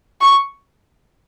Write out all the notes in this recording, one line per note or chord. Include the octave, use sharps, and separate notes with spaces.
C#6